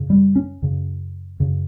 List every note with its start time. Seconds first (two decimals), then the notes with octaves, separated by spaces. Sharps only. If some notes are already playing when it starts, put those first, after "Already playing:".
Already playing: F#2 C#3
0.10 G3
0.36 C#4
0.62 F#2 C#3
1.40 F#2 C#3